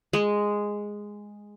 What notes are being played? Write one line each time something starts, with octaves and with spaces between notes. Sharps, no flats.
G#3